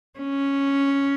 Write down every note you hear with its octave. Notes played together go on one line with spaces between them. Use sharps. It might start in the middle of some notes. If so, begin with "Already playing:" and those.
C#4